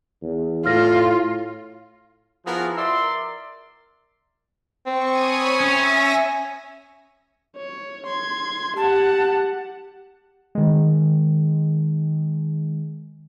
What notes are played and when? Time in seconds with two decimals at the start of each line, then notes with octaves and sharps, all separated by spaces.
0.22 E2
0.66 A2 F4 F6 A#6
2.46 F3 B3 E4 F#4 G#4 A#4
2.77 A#4 D5 E5 C6
4.86 C4 C#6
5.18 C#5 G#5 B5 C#6 D#6
5.60 C#4 E5 A#6
7.57 C#5
8.07 C6 G#6
8.77 G4 F#5 A5
10.55 D#3 G#3